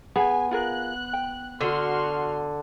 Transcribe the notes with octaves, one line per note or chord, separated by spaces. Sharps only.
B3 G#4 G#5
F4 G#4 A#4 F#6
G5
D3 F#4 C6 F6